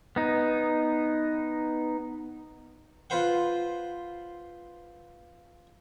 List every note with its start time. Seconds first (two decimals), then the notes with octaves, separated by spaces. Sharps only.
0.16 B3 D#4
3.10 F4 B4 C5 F#5